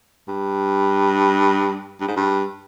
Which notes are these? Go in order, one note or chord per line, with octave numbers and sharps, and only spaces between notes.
G2
G2
G#2
G2